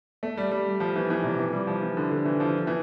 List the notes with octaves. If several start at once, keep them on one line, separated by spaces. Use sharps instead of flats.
A3
G3
G3
F3
E3
E3
C3
E3
G3
F3
E3
D3
D3
E3
F3
E3